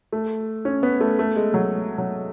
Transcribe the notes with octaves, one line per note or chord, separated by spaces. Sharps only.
A3
C#4
B3
A3
A3
G#3
F#3
F#3